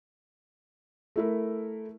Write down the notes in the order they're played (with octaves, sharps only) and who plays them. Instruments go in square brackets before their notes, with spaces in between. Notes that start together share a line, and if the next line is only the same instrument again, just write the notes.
[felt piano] A3 E4 A#4